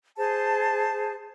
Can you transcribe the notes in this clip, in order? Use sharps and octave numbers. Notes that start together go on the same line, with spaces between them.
G#4 C5 A5